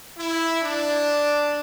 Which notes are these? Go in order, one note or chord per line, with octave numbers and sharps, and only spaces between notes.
E4
D4